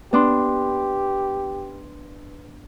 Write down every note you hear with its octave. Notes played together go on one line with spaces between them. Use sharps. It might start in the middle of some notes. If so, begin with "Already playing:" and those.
B3 D4 G4 B4 C6